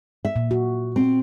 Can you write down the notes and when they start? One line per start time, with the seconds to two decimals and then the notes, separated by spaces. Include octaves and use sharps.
0.25 E5
0.36 A#2
0.51 F#4
0.96 C4